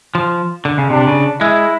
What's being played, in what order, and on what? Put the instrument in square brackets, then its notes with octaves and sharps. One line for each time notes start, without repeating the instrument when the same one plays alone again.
[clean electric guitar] F3
D3
C#3
[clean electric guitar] C3 [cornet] D4
[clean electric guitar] C#3
[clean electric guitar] G#3 [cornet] E4